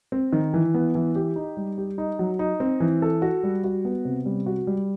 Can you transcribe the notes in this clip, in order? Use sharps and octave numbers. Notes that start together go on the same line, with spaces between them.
C4
D#3
E3
B3
E3
G4
D#4
G3
G4
D#4
F#3
D#4
C4
E3
A4
F#4
G3
F#4
B3
C3
G3
F#4
G3